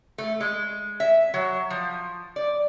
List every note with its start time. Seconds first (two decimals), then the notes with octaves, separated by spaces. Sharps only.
0.18 A3
0.40 G#3
1.00 E5
1.34 F#3
1.70 F3
2.36 D5